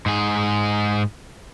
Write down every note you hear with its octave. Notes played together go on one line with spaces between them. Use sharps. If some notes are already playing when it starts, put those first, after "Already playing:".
G#2 G#4